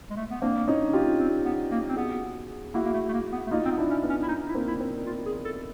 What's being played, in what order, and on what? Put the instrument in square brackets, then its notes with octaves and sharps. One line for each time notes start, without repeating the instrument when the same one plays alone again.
[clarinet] G#3
A3
B3
[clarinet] A#3 [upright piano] C4 D4
[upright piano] C#4 D#4
F4 G4
[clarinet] C4
B3
A#3
C4
[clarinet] B3 [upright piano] F#4 G#4
[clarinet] A#3 [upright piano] E4 F#4
[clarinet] A#3
A3
A3
A#3
B3
A3
[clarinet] A#3 [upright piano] D#4 F4
[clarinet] C4
B3
[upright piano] D4 E4
[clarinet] C#4
[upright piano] B3
[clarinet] C#4
E4
[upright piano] B3 [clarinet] D#4
[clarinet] E4
[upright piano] A#3 C4
[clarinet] E4
[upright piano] A#3 C4
[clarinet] F4
G#4
A4